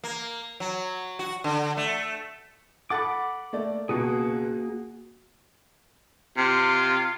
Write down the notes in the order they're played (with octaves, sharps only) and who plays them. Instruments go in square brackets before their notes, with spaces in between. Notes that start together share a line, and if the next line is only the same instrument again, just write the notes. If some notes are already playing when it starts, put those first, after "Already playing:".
[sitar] A#3
F#3
F#4
D3
A3
[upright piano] A4 F#5 A6 [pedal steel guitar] B5 D6
[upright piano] A3 A#3 D5
[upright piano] C#2 B2 [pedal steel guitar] A#3 F#4 G#4
[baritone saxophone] C3 [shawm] F4